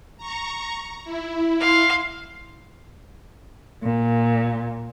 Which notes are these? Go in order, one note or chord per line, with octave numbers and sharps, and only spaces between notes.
A#5 C#6
E4
F5 C6
A#2